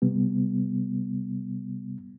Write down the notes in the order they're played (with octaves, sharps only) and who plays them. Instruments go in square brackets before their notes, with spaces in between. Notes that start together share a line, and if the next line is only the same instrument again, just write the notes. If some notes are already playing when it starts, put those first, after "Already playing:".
[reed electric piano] C3 G3 B3